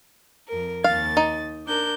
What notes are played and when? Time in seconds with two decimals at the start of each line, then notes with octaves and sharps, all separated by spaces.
0.49 F2 A#4
0.84 D#2 F5 A6
1.17 D#4
1.65 D4 A#4 G6